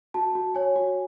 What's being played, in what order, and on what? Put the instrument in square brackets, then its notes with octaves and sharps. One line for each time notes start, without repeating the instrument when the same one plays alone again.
[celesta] F#4 A5
F#4
C#5 G#5
F#4